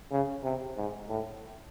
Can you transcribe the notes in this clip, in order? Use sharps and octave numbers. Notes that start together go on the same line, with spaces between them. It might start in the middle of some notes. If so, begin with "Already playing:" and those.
C#3
C3
G#2
A2